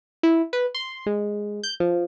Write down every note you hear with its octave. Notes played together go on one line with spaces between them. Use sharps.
E4
B4
C6
G#3
G6
F3